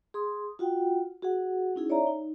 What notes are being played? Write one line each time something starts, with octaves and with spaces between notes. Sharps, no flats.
G#4 C6 D#6
F4 F#4 F#5 G5
F#4 G#4 F#5
C#4 D#4 E4 G#4
C#5 D5 E5 A#5
D#4